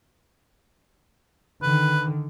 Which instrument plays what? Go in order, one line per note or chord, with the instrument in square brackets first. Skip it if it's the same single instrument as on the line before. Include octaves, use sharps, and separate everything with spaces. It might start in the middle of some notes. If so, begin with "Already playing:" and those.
[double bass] D3 D#3 [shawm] B4